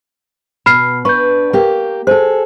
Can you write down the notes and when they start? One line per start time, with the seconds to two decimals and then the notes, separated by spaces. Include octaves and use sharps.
0.66 B2 B5 F6 C7
1.05 D4 B4 C#6 G6
1.53 A#3 G4
2.07 G#4 A4 C5